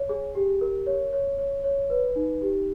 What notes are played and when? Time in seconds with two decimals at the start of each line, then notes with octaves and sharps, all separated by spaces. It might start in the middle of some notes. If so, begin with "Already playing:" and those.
Already playing: C#5
0.09 G#4
0.35 G4
0.61 A#4
0.86 C#5
1.13 C#5
1.38 C#5
1.64 C#5
1.90 B4
2.16 D#4
2.41 G4